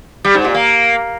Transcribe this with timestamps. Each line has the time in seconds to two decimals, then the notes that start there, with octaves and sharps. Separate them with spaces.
0.25 G3
0.34 G#2
0.44 A#2
0.54 A#3